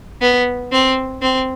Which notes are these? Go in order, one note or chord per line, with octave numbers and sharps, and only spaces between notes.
B3
C4
C4